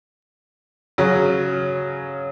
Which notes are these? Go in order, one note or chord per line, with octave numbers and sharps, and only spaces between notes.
C#3 F#3 C#4